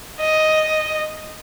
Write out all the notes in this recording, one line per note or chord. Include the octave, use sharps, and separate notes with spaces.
D#5